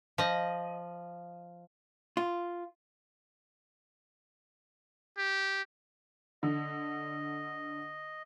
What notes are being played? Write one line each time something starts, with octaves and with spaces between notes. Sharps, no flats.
F3 D#5
F4
G4
D3 D#5